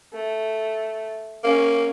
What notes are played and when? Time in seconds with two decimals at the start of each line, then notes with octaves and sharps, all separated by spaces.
0.13 A3
1.44 A#3 C#4